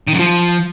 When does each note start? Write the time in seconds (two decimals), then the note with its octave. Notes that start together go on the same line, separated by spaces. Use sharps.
0.08 D#3
0.14 F#2
0.19 F3